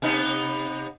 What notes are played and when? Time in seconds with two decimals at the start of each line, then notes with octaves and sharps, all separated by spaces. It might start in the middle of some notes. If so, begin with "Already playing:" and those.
0.02 C3 B3 D#4